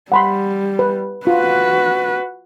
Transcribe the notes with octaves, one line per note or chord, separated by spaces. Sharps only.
G3 F#5 B5 C6
B4
F4 F#4 B4